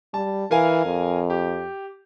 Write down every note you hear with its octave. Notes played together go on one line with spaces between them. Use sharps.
G3 A5
E3 A#4 F5 G#5
F2
G4